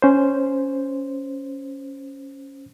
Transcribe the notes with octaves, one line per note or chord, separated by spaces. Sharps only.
C#4 C5